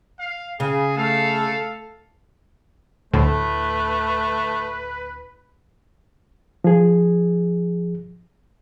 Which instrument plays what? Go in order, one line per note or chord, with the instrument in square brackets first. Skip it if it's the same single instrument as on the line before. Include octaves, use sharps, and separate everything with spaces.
[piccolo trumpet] F5
[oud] C#3 [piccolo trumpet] G#4
[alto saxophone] A3 [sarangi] A4 [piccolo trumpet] F5
[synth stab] D2 A2 [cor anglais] A3 [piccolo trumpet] B4
[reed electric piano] F3 G#4